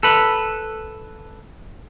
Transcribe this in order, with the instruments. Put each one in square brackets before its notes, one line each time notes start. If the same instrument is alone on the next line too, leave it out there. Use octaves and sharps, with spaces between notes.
[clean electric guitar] A4 B4